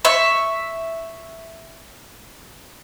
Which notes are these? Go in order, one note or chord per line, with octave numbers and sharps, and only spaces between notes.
E5 C#6